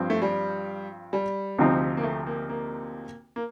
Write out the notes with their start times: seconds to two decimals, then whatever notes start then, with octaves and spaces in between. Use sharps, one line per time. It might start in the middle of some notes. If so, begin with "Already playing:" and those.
Already playing: G2 F3 C4
0.10 A3
0.22 G3
1.13 G3
1.58 D2 C3 F3 C4 D#4
1.97 A#3
2.03 A3
2.27 A#3
2.49 A#3
3.36 A#3